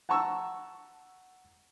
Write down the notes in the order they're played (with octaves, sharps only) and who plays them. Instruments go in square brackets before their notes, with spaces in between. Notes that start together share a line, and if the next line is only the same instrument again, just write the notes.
[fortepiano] F#5 A5 A#5 C#6 E6